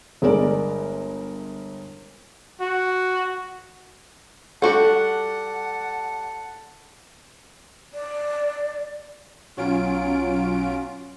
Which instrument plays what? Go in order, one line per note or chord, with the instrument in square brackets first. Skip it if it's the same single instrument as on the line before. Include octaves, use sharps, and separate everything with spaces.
[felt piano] G1 G#3 A#4 D5
[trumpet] F#4
[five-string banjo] G3 F#4 G4 [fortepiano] A4 [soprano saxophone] F#5 [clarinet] A5
[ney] D5
[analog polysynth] B1 F#3 C#4 F4 D7